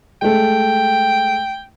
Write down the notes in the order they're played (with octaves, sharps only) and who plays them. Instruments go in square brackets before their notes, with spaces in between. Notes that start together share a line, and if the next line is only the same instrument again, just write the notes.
[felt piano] G#3 A3 [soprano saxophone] G5